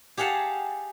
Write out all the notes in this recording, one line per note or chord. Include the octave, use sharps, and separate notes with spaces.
G4 G#4 F5 F#5 A5